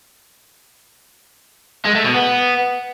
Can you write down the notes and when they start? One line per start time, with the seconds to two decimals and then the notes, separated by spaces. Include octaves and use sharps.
1.85 G#3
1.95 A3
2.05 B2
2.14 B3